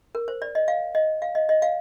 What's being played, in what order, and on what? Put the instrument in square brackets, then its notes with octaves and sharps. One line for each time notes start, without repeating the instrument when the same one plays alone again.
[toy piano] A#4
C5
D5
D#5
F5
D#5
F5
D#5
D#5
F5